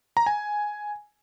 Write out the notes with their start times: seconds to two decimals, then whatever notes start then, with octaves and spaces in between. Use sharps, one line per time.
0.17 A#5
0.26 G#5